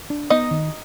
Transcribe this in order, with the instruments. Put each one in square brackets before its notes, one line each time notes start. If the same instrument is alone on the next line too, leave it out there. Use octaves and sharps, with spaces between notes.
[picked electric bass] D4
[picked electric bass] B3 [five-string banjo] D#4 D#5
[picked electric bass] D#3